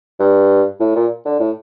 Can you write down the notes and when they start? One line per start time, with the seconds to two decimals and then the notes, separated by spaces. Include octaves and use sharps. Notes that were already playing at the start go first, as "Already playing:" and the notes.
0.20 G2
0.80 A2
0.95 A#2
1.25 D3
1.40 A2